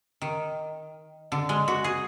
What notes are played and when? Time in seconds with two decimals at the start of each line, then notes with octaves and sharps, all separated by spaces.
0.22 D#3
1.32 D3
1.49 G#3
1.68 F#4
1.84 G#4